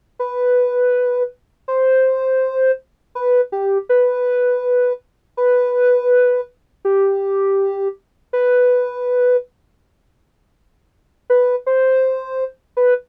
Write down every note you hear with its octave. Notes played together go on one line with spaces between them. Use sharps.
B4
C5
B4
G4
B4
B4
G4
B4
B4
C5
B4